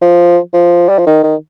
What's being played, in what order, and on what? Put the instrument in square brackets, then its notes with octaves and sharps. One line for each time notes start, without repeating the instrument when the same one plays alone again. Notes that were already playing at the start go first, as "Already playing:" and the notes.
[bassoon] F3
F3
G3
F3
D#3
D#3